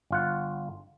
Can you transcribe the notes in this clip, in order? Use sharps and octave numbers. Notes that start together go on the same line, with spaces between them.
G1 F4 F#5